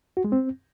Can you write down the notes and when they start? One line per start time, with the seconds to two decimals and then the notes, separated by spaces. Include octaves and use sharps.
0.17 F#4
0.24 G#3
0.32 C4